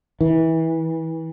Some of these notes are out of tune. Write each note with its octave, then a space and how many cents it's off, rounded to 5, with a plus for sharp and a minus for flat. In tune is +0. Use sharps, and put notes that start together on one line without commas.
E3 -25